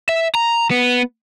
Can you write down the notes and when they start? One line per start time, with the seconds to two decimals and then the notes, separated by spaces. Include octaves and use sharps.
0.09 E5
0.35 A#5
0.71 B3